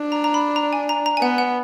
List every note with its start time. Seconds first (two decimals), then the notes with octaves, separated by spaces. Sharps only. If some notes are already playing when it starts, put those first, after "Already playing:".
Already playing: D4
0.12 A#5
0.24 A#5
0.34 B5
0.56 A#5
0.73 G#5
0.89 A#5
1.06 A#5
1.17 G#5
1.22 B3 F#5
1.38 F#5